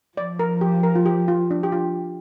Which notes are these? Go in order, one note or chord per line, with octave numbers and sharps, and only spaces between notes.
F3 D5
A#4
G4
A#4
F4
G4
F4
D4
G4
F4